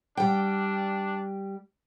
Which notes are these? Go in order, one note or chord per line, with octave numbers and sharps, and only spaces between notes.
G3 D4 G5